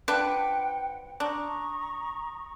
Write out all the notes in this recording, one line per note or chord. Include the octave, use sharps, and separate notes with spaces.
F3 D4 B4 F#5 G5
D4 A#5 C#6 D#6